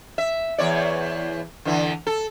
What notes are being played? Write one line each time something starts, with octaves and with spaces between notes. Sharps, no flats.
E5
E2 C#5 D5
D3 E3
A4